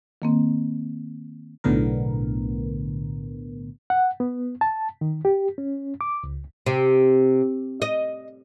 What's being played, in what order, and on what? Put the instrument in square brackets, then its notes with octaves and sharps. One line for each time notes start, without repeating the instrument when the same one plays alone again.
[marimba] D#3 A#3 C4
[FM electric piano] B1 A2 D3 B3 A#4
[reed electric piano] F#5
B3
A5
D#3
G4
C#4
D6
C#2
[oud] C3
D#5